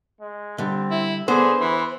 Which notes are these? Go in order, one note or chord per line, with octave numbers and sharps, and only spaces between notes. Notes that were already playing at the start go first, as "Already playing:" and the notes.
G#3
D3 G3 C4
E4
D3 B3 G#4 C5
E3 B5